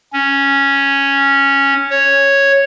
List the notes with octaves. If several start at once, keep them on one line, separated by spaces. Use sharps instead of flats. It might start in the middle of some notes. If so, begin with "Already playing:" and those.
C#4
C#5